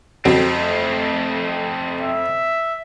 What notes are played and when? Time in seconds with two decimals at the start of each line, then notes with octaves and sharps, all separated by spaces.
0.25 F2 F#3 A3 C4
2.01 E5